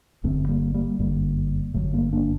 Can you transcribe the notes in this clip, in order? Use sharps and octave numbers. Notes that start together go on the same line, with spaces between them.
G1 F#2 D3 A3 C4
G3 A#3
G3 A#3
G1 F#2 D3 G3 A#3
G1 F#2 D3 F#3 A3
G3 A#3
A#3 D4